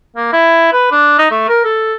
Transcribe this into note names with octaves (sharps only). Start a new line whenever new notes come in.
A#3
E4
B4
D4
D#4
A3
A#4
A4